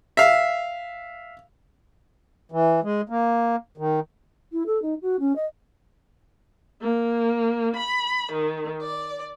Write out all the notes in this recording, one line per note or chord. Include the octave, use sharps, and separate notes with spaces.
E5 F5
E3
G#3
A#3
D#3
E4
A4
D#4
F#4
C#4
D#5
A#3
B5
D#3
D5